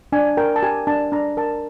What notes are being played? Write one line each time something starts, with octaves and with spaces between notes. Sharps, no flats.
D4 G#5
A#4 G5
A5
G4 G#5
D4 A5
D4 A#5
A#4 A5